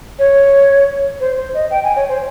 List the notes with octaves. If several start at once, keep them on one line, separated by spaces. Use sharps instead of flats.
C#5
C5
C5
D#5
G5
G#5
C#5
C5